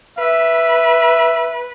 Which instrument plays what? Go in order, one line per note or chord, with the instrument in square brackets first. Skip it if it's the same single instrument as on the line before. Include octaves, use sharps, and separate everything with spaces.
[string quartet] B4 [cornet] E5